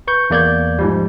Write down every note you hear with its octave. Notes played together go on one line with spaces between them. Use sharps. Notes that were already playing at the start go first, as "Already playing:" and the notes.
B4 C#6 G6
E2 A#3 D5 G6 G#6
G#2 F3 G3